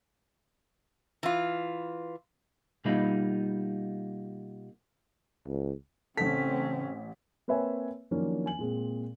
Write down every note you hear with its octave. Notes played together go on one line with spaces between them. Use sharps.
E3 F4
B2 G3 A#3 D#4 F4 B5
C#2
A1 C#3 C4 C#4 A4 B6
A#3 C4 B4 C#5 E5 G#5
D#3 F3 F#3 A#3 C#4 D4
G#5 F#7
A#2 G#3 C4